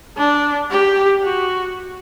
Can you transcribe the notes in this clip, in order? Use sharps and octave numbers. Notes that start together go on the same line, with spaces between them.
D4
G4
F#4